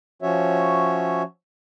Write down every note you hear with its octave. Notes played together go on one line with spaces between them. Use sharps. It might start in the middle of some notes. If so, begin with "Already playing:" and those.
F3 C#4 F#4 C#5 E5